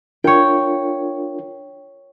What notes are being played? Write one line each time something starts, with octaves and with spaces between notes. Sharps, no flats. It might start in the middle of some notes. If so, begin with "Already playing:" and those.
D4 F4 A#4 C#5 G5